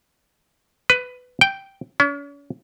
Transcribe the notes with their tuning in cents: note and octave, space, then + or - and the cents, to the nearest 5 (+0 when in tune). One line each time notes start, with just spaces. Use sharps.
B4 +15
G5 -5
C#4 +40